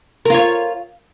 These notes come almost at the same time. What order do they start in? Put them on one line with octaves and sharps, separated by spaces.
A#4 F4 C#5